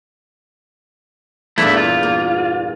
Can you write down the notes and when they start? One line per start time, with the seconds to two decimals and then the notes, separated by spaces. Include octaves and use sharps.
1.58 E2 G2 A#2 A3 E4
1.77 F4
2.03 A#3